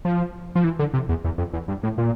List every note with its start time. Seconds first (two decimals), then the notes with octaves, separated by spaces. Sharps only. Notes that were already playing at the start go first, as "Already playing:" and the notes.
0.05 F3
0.55 F3
0.64 E3
0.79 D3
0.94 C3
1.09 E2
1.24 E2
1.38 F2
1.53 E2
1.68 G2
1.83 A2
1.98 A#2